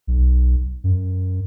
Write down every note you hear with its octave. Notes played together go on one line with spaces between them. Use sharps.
B1
F#2